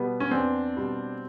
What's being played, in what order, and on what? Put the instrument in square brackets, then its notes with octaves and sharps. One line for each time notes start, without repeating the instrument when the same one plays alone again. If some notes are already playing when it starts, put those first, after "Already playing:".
Already playing: [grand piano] B2 G3 B3
C#4
E2 C4 D4
B2 G3